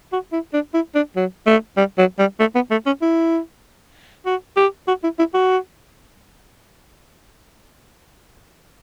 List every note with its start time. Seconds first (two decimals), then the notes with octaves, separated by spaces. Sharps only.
0.13 F#4
0.33 E4
0.53 D4
0.74 E4
0.95 D4
1.16 F#3
1.47 A3
1.77 G3
1.98 F#3
2.19 G3
2.40 A3
2.55 B3
2.71 A3
2.86 C#4
3.02 E4
4.26 F#4
4.57 G4
4.88 F#4
5.04 E4
5.19 E4
5.34 F#4